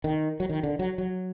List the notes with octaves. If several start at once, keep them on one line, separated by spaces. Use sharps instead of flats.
D#3
F#3
D#3
D3
F#3
F#3